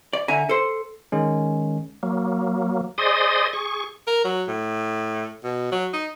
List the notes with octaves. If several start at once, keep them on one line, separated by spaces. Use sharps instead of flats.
D5
D3 E5 G#5 A#5
A4 C5
D#3 G#3 C#4
F#3 A#3
G#4 C5 D5 D#5 C6 D#6
G#4 C#6
A#4
F#3
A2
B2
F#3
D#4